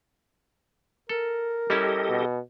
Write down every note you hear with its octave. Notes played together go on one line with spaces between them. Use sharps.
A4 A#4
G3 C#4 E4 G4 A4 D#5
B2